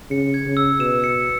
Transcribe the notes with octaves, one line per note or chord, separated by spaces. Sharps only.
C#3 C#7
G#6
C#3
E6
B2 E7
C#7